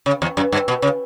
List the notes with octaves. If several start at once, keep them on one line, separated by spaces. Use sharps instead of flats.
C#3
E2
F#2
G2
B2
C#3